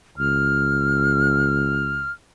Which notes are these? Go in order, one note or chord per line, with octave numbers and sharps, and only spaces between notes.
C#2 F6